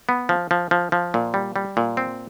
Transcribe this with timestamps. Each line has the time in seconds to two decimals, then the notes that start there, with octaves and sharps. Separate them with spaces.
0.09 B3
0.29 F3
0.51 F3
0.71 F3
0.92 F3
1.14 A#2
1.34 G3
1.56 G3
1.77 A#2
1.97 C4